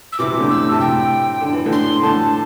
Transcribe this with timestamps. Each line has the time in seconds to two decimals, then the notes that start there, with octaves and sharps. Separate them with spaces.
0.12 E6
0.19 C3 E3 D6
0.30 C3
0.39 A2 D3
0.49 E6
0.60 A2
0.71 C3 A5
0.80 A2 G5
1.41 D3
1.53 E3
1.65 A2 D3
1.72 C6
2.02 A2 D3 A5